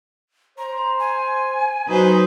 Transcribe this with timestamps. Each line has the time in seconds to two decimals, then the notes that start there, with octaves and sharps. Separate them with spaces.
0.58 C5 A#5
0.99 G#5
1.87 F#3 D#4 B4 C5